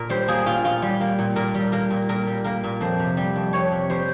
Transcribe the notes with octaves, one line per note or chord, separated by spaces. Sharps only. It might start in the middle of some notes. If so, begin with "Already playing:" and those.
Already playing: A#2 A#4
G3 C5
A#3 G#4
A#2 F4
A#2 F4
G3
A#3
A#2
A#2 A#4
G3
A#3 A#4
A#2
A#2 A#4
G3
A#3 A#4
A#2
F2 C5
C3
G3
F2
F2 C#5
C3
G3 C5